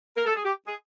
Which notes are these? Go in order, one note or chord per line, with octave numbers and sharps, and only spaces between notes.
A#4
A4
G#4
G4
G#4